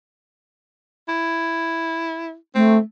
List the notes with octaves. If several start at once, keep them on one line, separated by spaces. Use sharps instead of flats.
E4
A3 C4